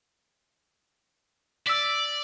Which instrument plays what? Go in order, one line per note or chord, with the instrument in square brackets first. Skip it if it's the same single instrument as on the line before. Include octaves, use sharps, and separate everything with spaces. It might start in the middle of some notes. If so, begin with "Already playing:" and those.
[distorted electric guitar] D5 [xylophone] E6 B6